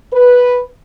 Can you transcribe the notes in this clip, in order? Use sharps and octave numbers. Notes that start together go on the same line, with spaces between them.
B4